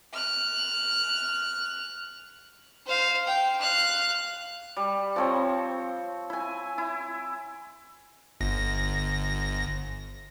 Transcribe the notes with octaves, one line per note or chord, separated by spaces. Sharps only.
F6 F#6
C5 F5
G5
F5 F#6
G3
F3 C4 C#5
E4 G#5
E4
G1 A#6